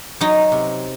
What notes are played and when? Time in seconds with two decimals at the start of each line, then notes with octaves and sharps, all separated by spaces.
0.21 F#3 D#4
0.52 C3